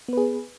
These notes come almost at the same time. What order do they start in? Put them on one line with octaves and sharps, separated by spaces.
B3 B4 G#4